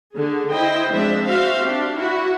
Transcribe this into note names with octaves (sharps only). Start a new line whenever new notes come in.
D3 G#4
E4 C5 D#5 G5
F3 G#3 C4 D4 E5
C4 F#4 C5 E5 F5
D4 G4
E4 F#4